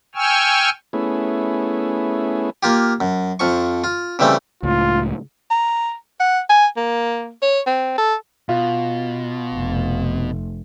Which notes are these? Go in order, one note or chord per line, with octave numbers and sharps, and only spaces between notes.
G5 G#5 C#6 E6 F6
A3 B3 C#4 E4 G#4
A#3 F4 G4
F#2
F2 F3 C#6
F4
C#3 E3 G3 A3 C4
C#2 A2 F4
A#5
F#5
G#5
A#3
C#5
C4
A4
B2 F4
F1